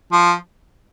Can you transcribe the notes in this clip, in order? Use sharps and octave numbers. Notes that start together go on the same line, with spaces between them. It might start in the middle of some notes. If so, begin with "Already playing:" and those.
F3